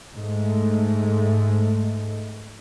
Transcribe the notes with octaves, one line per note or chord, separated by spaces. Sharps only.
G#2 G#3 A3